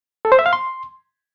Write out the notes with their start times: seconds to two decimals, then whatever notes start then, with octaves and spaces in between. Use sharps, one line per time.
0.25 A4
0.32 C5
0.39 E5
0.46 F5
0.53 C6